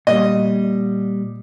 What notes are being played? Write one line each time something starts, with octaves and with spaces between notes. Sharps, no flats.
A#2 G3 D#5